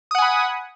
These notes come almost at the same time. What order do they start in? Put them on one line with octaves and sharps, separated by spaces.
D#6 F#5 G#5 B5